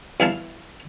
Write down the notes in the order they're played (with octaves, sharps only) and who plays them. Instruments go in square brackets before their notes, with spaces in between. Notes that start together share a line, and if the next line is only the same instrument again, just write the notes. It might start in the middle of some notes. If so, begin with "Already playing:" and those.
[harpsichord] E2 E4 F5 A5